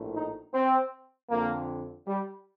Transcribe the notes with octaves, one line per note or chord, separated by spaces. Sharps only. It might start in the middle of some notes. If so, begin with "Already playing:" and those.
Already playing: A#1 A2
D#4
C4
F2 D3 A#3
G3